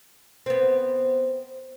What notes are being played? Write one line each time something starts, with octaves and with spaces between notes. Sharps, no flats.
B3 C4